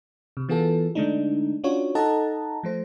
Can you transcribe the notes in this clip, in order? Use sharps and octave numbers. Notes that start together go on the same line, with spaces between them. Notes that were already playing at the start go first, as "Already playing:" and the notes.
C3
E3 B3 F4 G#4 A4
D3 G#3 A3 D4 D#4
C#4 D4 F4 F#4 C#5
D#4 A4 D#5 F#5 A5 A#5
F3 A3 C5